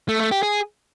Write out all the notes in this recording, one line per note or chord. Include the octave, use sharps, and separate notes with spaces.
A3
A3
G4
G#4